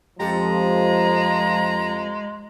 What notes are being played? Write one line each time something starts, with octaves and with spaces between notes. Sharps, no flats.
F2 F3 G#3 G4 A4 A#5